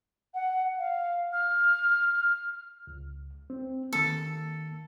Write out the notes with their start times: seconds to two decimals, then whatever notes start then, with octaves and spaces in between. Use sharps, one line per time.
0.34 F#5
0.79 F5
1.33 F6
2.87 C#2
3.50 C4
3.93 D#3 A#3 A4